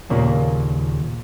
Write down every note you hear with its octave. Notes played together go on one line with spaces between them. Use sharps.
D#2 A#2 C#3 A#3